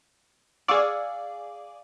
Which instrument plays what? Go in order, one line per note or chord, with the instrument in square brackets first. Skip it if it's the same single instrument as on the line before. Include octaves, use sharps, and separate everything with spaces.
[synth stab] G#4 D5 [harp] F5 C#6 E6